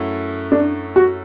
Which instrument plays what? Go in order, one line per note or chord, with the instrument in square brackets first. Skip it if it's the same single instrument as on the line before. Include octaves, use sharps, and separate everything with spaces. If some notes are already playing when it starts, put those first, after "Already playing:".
Already playing: [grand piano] F#2 F#3 A3 E4
[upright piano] D4
F#4